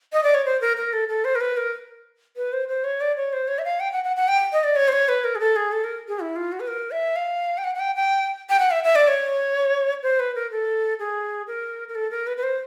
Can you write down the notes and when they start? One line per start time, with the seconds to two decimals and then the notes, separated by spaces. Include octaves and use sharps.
0.13 D#5
0.23 D5
0.34 C#5
0.45 C5
0.61 A#4
0.77 A#4
0.93 A4
1.08 A4
1.25 C5
1.35 A#4
1.41 B4
1.57 A#4
2.37 B4
2.53 C5
2.69 C5
2.84 C#5
3.01 D5
3.16 C#5
3.33 C5
3.48 C#5
3.59 E5
3.65 F5
3.80 G5
3.93 F#5
4.04 F#5
4.16 F#5
4.28 G5
4.53 D#5
4.64 D5
4.76 C#5
4.88 C5
4.92 C#5
5.09 B4
5.24 A#4
5.35 G#4
5.40 A4
5.56 G#4
5.72 A4
5.84 A#4
6.08 G#4
6.20 E4
6.36 F4
6.52 F#4
6.60 B4
6.68 A#4
6.91 E5
7.16 F5
7.58 G5
7.64 F#5
7.75 F#5
7.80 G5
7.96 G5
8.50 G5
8.59 F#5
8.71 E5
8.84 E5
8.95 D5
9.08 C#5
10.03 C5
10.20 B4
10.35 A#4
10.51 A4
10.99 G#4
11.47 A#4
11.88 A#4
11.95 A4
12.11 A#4
12.27 B4
12.37 B4
12.43 C5